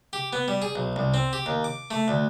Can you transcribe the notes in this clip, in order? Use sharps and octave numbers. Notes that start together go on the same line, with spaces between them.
G4
B3
G3
G#4
B1
C2
C4
G4
D#2
D6
A3
D2